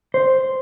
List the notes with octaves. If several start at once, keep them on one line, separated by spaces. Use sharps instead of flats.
C5